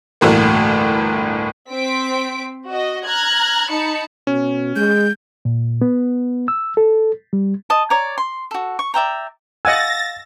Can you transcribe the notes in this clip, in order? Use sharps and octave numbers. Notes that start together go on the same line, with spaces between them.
G1 D2 A2 E3 A#3
C4 B6 D7
F#4 D#5
A#5 F6 F#6 G#6
D#4 A5 B5 C#7
B2 C#4
G#3 G6
A#2
B3
E6
A4
G3
D#5 A5
C#5 D5 A#5
C6
F#4 A4
C#6
D5 E5 G5 A#5
D#5 F5 F#5 G#5 E6 A6 A#6